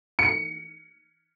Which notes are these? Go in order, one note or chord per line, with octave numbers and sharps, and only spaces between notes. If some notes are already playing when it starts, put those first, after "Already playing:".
C#7